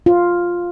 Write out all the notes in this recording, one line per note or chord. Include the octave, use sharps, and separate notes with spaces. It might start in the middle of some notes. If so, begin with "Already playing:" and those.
F4